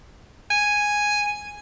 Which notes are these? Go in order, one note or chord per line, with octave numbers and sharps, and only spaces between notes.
G#5